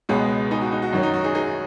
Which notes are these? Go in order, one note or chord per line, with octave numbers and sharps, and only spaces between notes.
C#2 B2 G#3 B3 G#4 C#5
D#4 G#4
F#4
D#4
F#4
F#2 D#3 F#3 C#4 F#4
D#4
F#4
D#4 G#4
D#4 G#4